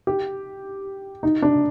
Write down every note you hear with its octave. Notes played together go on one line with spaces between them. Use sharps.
G4
D#4
D4